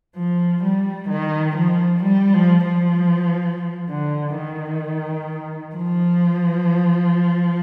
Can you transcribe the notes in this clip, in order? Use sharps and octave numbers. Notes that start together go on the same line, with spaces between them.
F3
G3
D#3
F3
G3
F3
F3
D3
D#3
F3